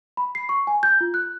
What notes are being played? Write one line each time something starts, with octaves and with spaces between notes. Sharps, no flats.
B5
C7
C#6
G#5
G6
F4
F#6